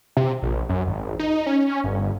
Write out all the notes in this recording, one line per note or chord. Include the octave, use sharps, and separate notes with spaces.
C3
A#1
F#2
G#1
D#4
C#4
G1